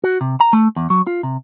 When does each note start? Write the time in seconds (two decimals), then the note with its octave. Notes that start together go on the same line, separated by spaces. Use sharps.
0.04 F#4
0.21 C3
0.40 A#5
0.53 A3
0.76 E2
0.90 F#3
1.07 F4
1.23 C3